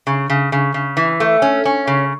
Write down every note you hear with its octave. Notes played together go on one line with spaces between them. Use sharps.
C#3
C#3
C#3
C#3
E3
A3
C#4
C#4
C#3